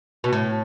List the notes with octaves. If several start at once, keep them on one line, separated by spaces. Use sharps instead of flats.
B2
A2